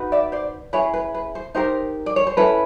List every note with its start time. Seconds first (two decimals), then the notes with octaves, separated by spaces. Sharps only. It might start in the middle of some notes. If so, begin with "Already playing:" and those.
Already playing: D#4 F#4 B4
0.12 D5 E5
0.32 C5 D5
0.73 C#4 E4 G#4 B4 C#5
0.94 B4
1.14 B4
1.35 C5
1.55 D#4 G4 A#4 C5
2.06 D5
2.16 C#5
2.27 C5
2.37 C#4 E4 A4 B4